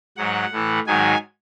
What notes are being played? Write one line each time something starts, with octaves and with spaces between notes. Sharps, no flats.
G#2 F#3 F#5
A2 E3
G#2 D#3 F#3 G#5